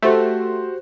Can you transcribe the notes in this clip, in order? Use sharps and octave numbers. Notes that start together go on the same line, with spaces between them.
A3 F#4 G4 C5